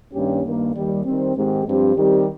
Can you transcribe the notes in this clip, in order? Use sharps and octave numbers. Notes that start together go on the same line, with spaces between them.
G2 D#3 A#3 C#4 G4
G2 D#3 A#3
D#2 D#3 G3
D#3 G3 C4
G#2 D#3 G#3 C4 G4
G2 F3 C4 G4
D#3 G3 C4 G4